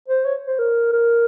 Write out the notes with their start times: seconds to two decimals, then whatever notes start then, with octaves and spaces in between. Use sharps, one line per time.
0.08 C5
0.25 C#5
0.47 C5
0.59 A#4
0.92 A#4